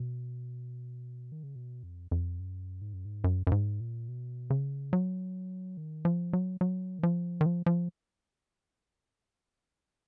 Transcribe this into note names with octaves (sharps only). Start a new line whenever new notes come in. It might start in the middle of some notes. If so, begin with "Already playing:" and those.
Already playing: B2
D#3
C#3
B2
F2
F2
F#2
G#2
F#2
G#2
F#2
F#2
G#2
A#2
B2
C#3
F#3
D#3
F3
F#3
F#3
D#3
F3
D#3
F3
F3